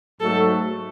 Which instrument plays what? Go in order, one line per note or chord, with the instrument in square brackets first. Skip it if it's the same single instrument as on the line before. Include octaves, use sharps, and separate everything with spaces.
[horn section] G#2 F#3 A3 [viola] A4